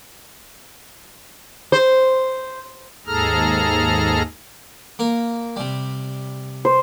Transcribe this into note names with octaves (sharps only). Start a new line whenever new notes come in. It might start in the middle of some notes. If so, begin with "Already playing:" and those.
C5
D#2 G#2 G#4 A4 A#5 F6
A#3 A#4
C3 G3
C5